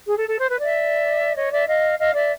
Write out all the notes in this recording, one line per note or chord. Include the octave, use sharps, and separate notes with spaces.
G#4
A4
A4
C5
B4
D5 E5
C#5 D#5
D5 E5
D#5 F5
D#5 F5
D5 E5